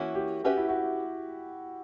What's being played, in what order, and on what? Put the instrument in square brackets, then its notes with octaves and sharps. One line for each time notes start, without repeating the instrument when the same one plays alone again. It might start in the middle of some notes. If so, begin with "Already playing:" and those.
Already playing: [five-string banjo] E3 A#3 C#4 E4 [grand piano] F#4
[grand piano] G4
[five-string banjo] C#4 G4 B4 E5 [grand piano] F#4
[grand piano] E4
F#4